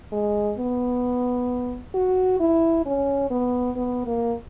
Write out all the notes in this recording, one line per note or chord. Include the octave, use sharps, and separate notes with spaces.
G#3
B3
F#4
E4
C#4
B3
B3
A#3